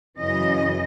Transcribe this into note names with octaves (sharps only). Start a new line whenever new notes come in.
F#2 C#3 E3 D#5